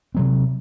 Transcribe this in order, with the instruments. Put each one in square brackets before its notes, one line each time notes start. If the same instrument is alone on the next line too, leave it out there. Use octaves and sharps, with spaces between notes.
[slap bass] C3 F#3 C4